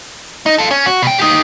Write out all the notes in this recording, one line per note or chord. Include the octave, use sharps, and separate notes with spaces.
D#4
F4 A4
C#4
F#4
B2 G5
D#4 G4